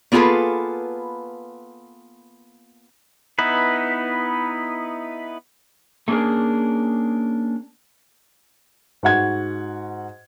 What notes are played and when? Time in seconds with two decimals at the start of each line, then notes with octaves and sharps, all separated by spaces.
0.12 A#3 B3 F4 G#4 A4 B4
3.39 B3 D#4 E4 B4
6.08 A3 A#3 C#4 D4 G#4 A#4
9.03 G#2 F#4 F#5 G#6